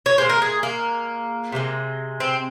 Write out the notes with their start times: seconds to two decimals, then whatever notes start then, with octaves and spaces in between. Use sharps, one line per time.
0.06 C#5
0.18 A#2 G#3 C5
0.29 A#4
0.42 G#4
0.63 A#3
1.52 C3 F3 G#3
2.20 C4